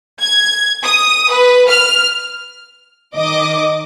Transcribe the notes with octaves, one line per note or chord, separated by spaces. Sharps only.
G#6
D#6
B4
F6
D#3 D#5 D6